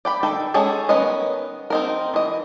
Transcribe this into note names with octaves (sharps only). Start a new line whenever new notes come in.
D5 G5 B5
D#3 A4 G5
G#3 C#4 G#4 A4
D#3 B3 C#4 D#5
C4 D#4 A#4
E3 D#5